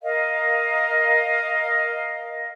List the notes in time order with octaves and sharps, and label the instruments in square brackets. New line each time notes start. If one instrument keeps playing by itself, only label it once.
[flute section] A#4 D#5 F5